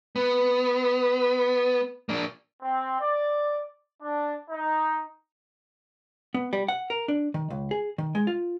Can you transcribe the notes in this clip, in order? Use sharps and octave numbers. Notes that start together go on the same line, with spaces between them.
B3
A#3 D4
C4
D5
D4
D#4
B3
G3
F#5
A#4
D4
D#3
C#2
G#4
D#3
G#3
F4